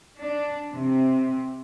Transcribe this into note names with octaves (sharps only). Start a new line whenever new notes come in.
D4
C3